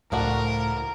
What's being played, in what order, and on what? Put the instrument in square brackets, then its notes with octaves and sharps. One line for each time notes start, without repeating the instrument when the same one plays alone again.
[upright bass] C#2 [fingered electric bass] A2 [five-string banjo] F3 D4 F#4 [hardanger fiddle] A#4